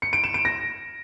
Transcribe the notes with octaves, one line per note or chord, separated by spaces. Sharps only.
C#7
D7
E7
D7
A#6